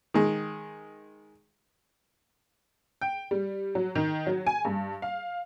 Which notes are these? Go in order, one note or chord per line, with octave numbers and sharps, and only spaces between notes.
D#3 G#3
G5
G3
F#3
D#3
F#3
G#5
G2
F5